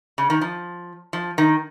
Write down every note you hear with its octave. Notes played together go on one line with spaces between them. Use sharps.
C#3
D#3
F3
F3
D#3